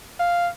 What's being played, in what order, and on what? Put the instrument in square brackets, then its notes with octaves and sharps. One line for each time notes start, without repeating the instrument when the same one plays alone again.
[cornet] F5